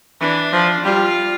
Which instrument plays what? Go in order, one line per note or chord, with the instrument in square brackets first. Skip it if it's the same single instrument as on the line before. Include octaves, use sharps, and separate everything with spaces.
[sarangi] E3 [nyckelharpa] D4
[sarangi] F3
[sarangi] G3 [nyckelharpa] F4